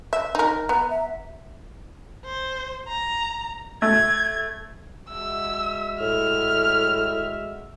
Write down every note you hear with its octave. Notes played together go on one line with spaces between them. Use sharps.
E5
D#4 A#4
B3 A#5
E5
C5
A#5
A3 G#6
G#3 F#4 E5 E6
A2 F6